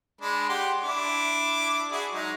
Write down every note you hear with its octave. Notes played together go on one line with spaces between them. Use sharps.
G#3 D4 B5
G4 F#5 C6
D4 E4 D6
E4 F#4 G#4
F#3 G#3 D#4